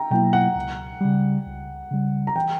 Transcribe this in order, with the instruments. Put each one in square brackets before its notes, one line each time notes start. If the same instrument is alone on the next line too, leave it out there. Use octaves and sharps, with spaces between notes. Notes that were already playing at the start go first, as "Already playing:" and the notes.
Already playing: [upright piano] G5 A#5
[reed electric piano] B2 F#3 A#3 E4 [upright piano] G5
[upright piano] F#5
[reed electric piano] C#2
C#3 G3
C#2
C#3 G3
[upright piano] A#5
[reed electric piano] E3 [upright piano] G5